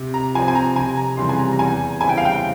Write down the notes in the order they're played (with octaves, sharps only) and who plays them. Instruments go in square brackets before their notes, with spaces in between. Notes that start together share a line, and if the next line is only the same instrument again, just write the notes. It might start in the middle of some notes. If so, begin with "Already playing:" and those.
Already playing: [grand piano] C3
[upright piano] A#5
[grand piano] F3 C4 [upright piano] G#5
[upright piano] G#5
A#5
[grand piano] F1 [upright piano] G#5
[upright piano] A#5
[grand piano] F2 C#3 E3 G3 [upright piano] C6
[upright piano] G#5
A#5
A#5
[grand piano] E2 [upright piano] G#5
[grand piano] C#3 G3 C4 E4 [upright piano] G#5
[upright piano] G5
F5
G5